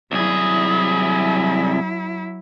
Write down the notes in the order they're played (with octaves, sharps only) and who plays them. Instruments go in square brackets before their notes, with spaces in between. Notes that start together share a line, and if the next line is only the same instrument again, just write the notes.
[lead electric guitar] C2 G#4 [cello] F#3 E4